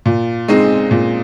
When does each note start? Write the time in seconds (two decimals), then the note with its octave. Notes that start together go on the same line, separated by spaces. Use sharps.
0.06 A#2
0.48 G#3 C4 D#4
0.91 A#2